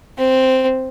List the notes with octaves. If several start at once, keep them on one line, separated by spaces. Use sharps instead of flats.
C4